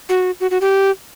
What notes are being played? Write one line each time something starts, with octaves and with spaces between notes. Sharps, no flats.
F#4
F#4
F#4
G4